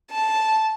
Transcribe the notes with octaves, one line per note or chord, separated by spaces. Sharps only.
A5